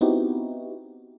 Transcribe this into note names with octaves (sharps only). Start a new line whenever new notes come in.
B3 C4 D#4 E4 F#4 G4